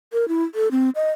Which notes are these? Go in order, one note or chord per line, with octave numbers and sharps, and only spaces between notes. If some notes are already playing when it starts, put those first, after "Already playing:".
A#4
E4
A4
C4
D#5